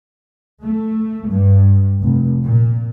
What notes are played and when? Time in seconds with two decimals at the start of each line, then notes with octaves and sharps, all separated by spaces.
0.64 A3
1.29 G2
2.03 F1
2.42 A#2